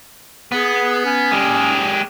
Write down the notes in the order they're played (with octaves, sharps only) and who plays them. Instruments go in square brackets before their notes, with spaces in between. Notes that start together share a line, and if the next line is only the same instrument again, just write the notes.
[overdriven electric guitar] B3 [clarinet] G#4
[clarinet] C#4
[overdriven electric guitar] G#3 G4